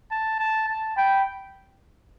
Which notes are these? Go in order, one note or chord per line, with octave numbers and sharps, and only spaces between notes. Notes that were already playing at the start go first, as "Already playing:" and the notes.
A5
A5
A5
G5 B5